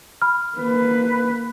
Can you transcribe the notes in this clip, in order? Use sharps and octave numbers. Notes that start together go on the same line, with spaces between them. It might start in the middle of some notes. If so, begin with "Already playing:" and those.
B5 F6
A#3 B4